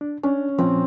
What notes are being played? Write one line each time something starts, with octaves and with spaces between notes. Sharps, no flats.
D4
C#4 D4
A#2 F3 C4